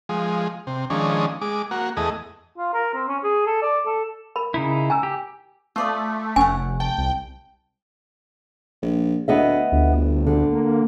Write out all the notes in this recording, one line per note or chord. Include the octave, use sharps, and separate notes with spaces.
F3 G#3
C3
D#3 F3 G#3 C#4 D4
G#3 D6
A#3 F#4
E2 A3 G#4 D#5
F4
A#4
C4
C#4
G#4
A4
D5
A4
A#4 B5
C#3 D#4 E4
G#5 A#5 E6
G4
A3 F4 D5 D#6
F1 C#5 F#5 G#5
G5 A5
C2
A#1
D2 B3 D#5 E5
G1 D2
D3
A#3